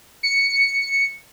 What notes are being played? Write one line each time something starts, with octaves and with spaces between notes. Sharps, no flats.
C#7